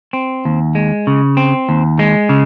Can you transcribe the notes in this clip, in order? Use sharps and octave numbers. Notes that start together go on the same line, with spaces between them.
C4
D#2
G#3
C#3
C4
D#2
G#3
C#3